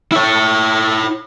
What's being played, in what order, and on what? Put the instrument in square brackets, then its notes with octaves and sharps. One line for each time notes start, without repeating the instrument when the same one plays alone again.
[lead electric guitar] E4 C#5